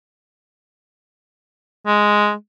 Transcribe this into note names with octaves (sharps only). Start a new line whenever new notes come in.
G#3